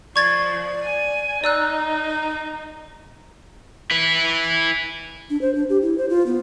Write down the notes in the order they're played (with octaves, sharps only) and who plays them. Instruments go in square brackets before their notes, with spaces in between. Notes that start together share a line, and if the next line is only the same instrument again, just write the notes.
[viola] F3 [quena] D5 [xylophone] C#6 G#6 A6
[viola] G#5
[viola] D#4 [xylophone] D5 E6 F#6 [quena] A#5
[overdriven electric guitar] E4 B4
[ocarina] D4
C5
D4
G4
E4
C5
F4
B3